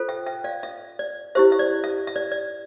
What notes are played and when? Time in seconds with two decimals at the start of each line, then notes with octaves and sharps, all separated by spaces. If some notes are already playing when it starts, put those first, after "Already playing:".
Already playing: F4 A4 C5
0.09 E5 G5
0.27 E5 G5
0.44 D5 F5
0.63 E5
0.99 D5
1.35 E4 G4 C5 E5
1.52 E5
1.59 D5
1.84 E5
2.07 E5
2.16 D5
2.32 D5